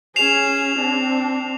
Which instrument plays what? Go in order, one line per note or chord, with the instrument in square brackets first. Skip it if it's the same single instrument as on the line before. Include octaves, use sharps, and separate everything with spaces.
[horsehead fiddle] C#4 G#4 [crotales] C7 E7 F7
[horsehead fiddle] C4 D4